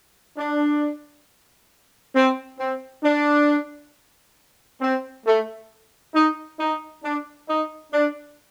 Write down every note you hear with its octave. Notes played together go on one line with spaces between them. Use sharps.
D4
C4
C4
D4
C4
A3
D#4
D#4
D4
D#4
D4